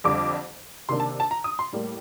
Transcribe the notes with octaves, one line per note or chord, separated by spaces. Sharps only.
F2 D3 G3 D6
C3 D#3 A#3 D4 C6
A5
A5
A#5
D#6
C6
A2 G3 A#3